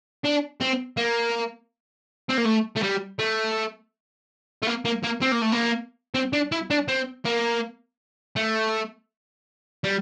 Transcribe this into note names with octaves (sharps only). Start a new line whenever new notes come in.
D4
C4
A#3
C4
A#3
A3
A3
G3
A3
A3
A#3
A#3
A#3
C4
A#3
A3
A#3
C4
D4
E4
D4
C4
A#3
A3
G3